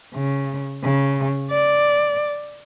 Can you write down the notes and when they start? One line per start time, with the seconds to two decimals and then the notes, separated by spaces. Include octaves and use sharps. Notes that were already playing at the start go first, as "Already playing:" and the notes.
0.15 C#3
0.84 C#3
1.51 D5